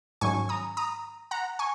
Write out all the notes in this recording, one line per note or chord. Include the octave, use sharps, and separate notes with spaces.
G#2 D#3 F#3 C#4 G#5 C#6
A#5 D#6
A#5 D#6
F#5 A#5
G#5 C#6